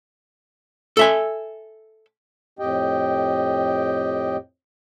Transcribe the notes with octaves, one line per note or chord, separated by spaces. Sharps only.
A4 E5 G#5
F2 A2 G4 D#5 G5